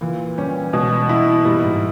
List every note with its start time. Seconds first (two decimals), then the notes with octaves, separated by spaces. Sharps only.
0.01 A#2 E3
0.38 G3 C#4
0.73 B2 G#3
0.91 B3
1.09 A#3 E4
1.45 A#2 G3
1.63 G#2